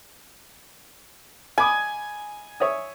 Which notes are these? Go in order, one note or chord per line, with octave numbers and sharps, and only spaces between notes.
G#5 B5 D6 D#6
C#5 E5 D#6